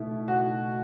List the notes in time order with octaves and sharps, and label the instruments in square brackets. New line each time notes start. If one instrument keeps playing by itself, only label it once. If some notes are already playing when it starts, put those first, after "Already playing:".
Already playing: [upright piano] B2 A3 E4
F#4